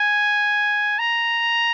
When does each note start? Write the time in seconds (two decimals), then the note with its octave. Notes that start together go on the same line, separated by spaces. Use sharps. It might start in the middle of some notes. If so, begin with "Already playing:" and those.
Already playing: G#5
0.99 A#5